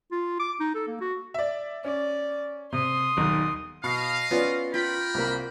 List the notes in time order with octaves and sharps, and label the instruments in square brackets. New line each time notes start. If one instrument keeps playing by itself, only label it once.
[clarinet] F4
D6
D#4
A4
A#3
F#4
[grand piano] D5 E5
[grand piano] C#4 [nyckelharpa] D5
[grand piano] C3 [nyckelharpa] C6 D#6
[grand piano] D#1 B1 D#3
[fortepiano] B2 [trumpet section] D#5 F5
[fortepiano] B3 C#4 D5 [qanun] F4
[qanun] F4 [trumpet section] A#4 G5 B5
[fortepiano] C2 A#3